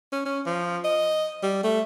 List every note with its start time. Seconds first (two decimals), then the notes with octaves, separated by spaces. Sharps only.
0.13 C#4
0.26 C#4
0.46 F3
0.85 D#5
1.43 G3
1.64 A3